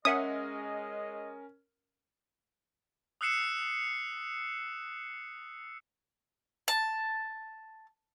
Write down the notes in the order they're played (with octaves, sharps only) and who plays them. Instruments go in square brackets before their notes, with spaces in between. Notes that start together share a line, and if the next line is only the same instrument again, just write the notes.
[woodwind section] G#3 D#5 [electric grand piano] C#4 A#4 [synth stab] C#5 E5 F#5 [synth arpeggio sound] D#6
[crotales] D#6 E6 F#6 C7 C#7 E7
[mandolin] A5